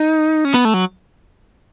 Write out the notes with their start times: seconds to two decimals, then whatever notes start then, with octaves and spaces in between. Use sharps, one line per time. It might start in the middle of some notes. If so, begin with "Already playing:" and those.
Already playing: D#4
0.45 C#4
0.54 B3
0.65 A3
0.74 F#3